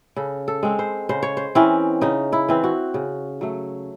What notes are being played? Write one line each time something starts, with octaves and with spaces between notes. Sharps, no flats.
C#3 A4
A4
G#3 C4
C5
C#3 C5
C#5
C5
E3 C4 C#4
C#3 D#4
E4
E3 C4
F#4
C#3
F#3 A3